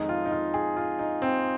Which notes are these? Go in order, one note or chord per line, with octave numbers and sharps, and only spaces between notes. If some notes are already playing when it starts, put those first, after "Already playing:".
Already playing: F2 D#3 G#3 D#4
F4
D#4
F4
G#4
F4
D#4
C4